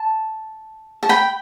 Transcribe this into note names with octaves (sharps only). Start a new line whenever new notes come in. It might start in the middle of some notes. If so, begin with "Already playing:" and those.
Already playing: A5
A5
G5 B5